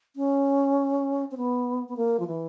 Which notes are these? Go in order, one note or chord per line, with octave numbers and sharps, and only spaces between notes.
C#4
C4
B3
B3
A#3
F3
E3